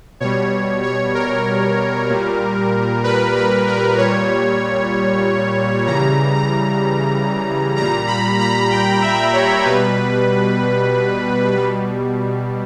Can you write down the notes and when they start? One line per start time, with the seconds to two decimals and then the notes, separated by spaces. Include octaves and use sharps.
0.20 B2 G3 C#5
0.83 C#5
1.15 A#4
2.10 A#2 G3
3.04 B4
3.36 B4
3.67 A#4
3.98 A#2 G3 C#5
5.87 C#3 E3 G3 A#5
6.35 A#5
7.76 A#2 G3 A#5
8.07 B5
8.39 A#5
8.71 G5
9.02 E5
9.33 C#5
9.65 B2 G3 B4
11.54 B2 G3